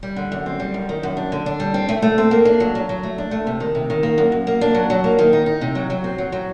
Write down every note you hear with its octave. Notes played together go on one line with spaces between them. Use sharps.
G3
D3
F#2
C4
G3
F#2
D#3
F#2
D4
D3
D4
G3
C4
A3
A3
C4
A#3
D4
F#3
F#3
F#3
A3
D4
A3
C3
D#3
C3
D#3
A#3
F#2
F#2
A#3
D4
F#3
F#3
A#3
D#3
D#4
D#4
C3
F#3
F#3
C4
F#3
F#3